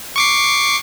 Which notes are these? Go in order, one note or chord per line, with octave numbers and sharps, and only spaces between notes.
C#6 D6 C7